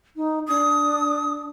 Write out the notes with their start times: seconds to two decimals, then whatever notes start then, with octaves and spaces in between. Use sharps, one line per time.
0.16 D#4
0.48 D4 D#6